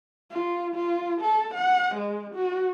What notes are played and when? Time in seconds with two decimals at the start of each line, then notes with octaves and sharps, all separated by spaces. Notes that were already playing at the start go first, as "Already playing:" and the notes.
0.32 F4
0.75 F4
1.22 A4
1.55 F#5
1.95 G#3
2.35 F#4